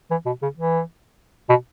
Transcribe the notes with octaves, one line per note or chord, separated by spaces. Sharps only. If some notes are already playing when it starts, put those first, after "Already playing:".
E3
B2
C#3
E3
B2